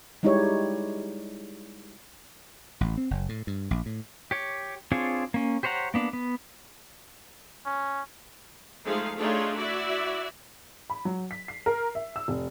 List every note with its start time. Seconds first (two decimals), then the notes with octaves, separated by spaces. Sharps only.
0.23 G3 G#3 D#4 E4 G4 C#5
2.81 A1
2.97 C4
3.11 F#1
3.29 A2
3.47 G2
3.71 A#1
3.86 A2
4.31 G4 C#5
4.92 C4 D4 F4 G#4 C#5
5.34 A#3 C#4
5.63 G4 C5 C#5 F#5 A#5
5.94 A#3 B3 D4
6.13 B3
7.65 C#4
8.85 F3 G#3 A3 D#4 G#4 F5
9.18 A3 D4 D#4 F4 G#4 C#5
9.55 E4 F#4 D5 E5
10.90 B5
11.05 F#3
11.31 B6
11.48 C7
11.66 A#4
11.95 E5
12.16 E6
12.28 F1